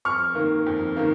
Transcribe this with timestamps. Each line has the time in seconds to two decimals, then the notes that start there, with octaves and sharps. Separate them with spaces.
0.05 F2 C#6 F6
0.35 D#3 A#3
0.66 F2
0.97 D#3 A#3